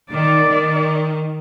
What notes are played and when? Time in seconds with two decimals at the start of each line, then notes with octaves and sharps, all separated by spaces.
0.11 D#3 D5
0.49 D#3